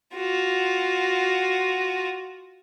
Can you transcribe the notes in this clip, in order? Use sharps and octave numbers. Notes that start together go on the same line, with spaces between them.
F4 F#4